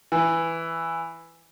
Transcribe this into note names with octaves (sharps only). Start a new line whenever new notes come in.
E3